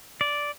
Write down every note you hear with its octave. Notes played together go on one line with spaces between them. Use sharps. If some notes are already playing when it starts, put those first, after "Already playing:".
D5